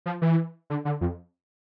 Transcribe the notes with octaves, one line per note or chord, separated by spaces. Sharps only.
F3
E3
D3
D3
F2